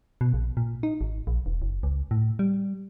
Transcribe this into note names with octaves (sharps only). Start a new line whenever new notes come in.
B2
A#1
A#2
D#4
G#1
A#1
E1
F#1
C#2
A2
G3